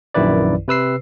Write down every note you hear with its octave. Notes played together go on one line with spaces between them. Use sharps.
A#1 F#2 D#3 E4 B4 D5
C3 B4 E6 C7